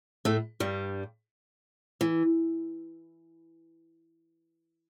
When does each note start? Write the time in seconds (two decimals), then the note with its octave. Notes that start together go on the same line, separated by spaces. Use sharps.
0.25 A2 A3
0.60 G2 G3
2.01 E3